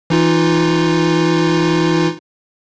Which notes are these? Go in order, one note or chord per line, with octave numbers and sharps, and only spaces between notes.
E3 D#4 F4